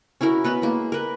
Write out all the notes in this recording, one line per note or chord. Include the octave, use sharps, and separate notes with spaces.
C#4 E4 F#4 A#4
B3 B4 D#5
G#3 A#3
A#4 B4